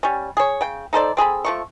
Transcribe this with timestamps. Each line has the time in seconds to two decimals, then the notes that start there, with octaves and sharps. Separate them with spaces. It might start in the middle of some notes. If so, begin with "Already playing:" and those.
0.03 G3 C#4
0.37 G#4 C#5
0.61 C#3 G5
0.93 D#4 A4 C5 D5
1.17 C4 G#4 A4 B5
1.45 F3 A3 C#6